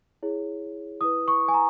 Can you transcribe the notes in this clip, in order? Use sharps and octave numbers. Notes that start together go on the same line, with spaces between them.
E4 G#4 C#5
E4 B4 D#6
C#6
G#5
A#5